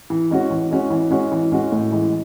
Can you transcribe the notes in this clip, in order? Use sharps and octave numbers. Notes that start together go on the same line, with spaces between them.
E3
G#3 C#4 F#4
E3
G#3 C#4 F#4
E3
G#3 C#4 F#4
E3
G#3 C#4 F#4
A2
E3 G#3